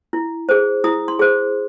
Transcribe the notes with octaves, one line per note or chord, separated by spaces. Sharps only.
E4
G#4 C5
E4 D#6
C6
G#4 C5